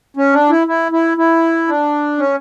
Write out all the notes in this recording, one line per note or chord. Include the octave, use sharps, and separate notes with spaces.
C#4
D4
E4
E4
E4
E4
D4
C#4